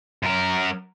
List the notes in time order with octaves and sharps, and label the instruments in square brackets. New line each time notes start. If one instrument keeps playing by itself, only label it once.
[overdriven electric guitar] F#2 A#4